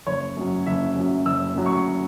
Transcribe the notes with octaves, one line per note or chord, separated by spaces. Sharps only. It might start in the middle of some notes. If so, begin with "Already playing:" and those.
F#1 C#5
F#2 F#3
F#1 E5
F#2 F#3
F#1 E6
F#2 F#3
C#6